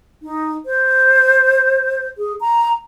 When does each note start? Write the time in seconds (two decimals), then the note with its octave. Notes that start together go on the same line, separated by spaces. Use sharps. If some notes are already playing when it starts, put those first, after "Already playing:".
0.22 D#4
0.66 C5
2.18 G#4
2.41 A#5